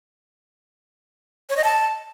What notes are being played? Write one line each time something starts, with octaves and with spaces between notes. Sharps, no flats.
C#5
D#5
A5